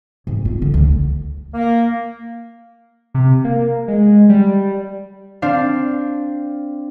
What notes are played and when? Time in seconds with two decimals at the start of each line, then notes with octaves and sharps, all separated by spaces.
0.27 G#2
0.45 B3 F4
0.62 D3
0.74 D2 D3
1.54 A#3
3.14 C3
3.44 A#3
3.88 G#3
4.29 G3
5.42 C4 D4 F5